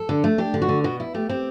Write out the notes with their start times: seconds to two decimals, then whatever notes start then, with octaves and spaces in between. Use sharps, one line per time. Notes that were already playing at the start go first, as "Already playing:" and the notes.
Already playing: A4
0.09 D3
0.24 A3
0.38 D4 G4
0.54 D3
0.62 F#4
0.69 D3
0.84 B2 F#4
1.00 E4
1.14 A3 G4
1.29 C4 G4